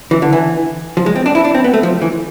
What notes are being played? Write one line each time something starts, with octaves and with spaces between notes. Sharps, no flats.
E3
D3
E3
F3
G#3
C4
D4
E4
D4
C4
B3
A3
F3
E3